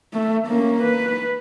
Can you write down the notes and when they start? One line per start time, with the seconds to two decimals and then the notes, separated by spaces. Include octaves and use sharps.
0.14 A3
0.47 A#3 C#4
0.83 B4